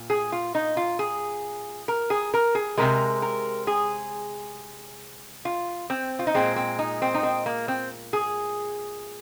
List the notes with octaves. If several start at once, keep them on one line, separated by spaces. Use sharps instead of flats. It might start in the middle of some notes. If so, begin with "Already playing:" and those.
Already playing: A#2
G#4
F4
D#4
F4
G#4
A#4
G#4
A#4
G#4
C3 D#3 G#3 A#4
A#4
G#4
F4
C4
F4
D#4
A#2 G#3 C4
C4
D#4
C4
D#4
C4
A#3
C4
G#4